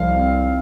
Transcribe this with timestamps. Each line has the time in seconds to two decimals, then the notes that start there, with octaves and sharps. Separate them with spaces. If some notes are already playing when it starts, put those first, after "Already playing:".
Already playing: C2 F3 F5
0.10 C4